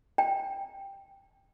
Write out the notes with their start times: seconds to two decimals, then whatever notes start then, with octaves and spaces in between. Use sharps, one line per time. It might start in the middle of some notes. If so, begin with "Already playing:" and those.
0.18 G5